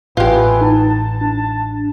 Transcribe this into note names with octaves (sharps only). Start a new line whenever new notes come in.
A1 A3 B3 F4 G4 B4 G#5
D#4 A5
D4